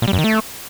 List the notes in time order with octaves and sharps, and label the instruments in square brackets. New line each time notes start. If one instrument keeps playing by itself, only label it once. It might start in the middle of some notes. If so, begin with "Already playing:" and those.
[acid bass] A#2
G3
F#2
D#3
A3